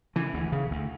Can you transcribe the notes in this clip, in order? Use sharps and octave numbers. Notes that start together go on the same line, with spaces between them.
C#3 E3
D2
C#3
D2